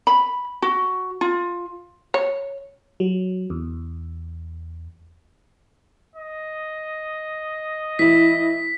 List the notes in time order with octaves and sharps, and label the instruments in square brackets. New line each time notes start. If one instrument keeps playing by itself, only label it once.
[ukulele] B5
F#4
F4
[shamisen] C#5
[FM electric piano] F#3
E2
[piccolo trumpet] D#5
[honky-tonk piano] E3 E4 [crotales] B6